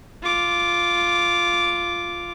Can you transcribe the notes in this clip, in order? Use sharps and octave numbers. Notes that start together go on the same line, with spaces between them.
F4 D6